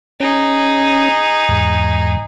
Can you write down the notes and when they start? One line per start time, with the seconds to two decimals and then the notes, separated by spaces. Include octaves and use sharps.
0.20 C#4 D#4 G#4
1.49 E2 G#2